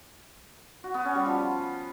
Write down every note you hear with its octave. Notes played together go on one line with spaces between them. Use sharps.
F#4
B3
C#4
G3
F3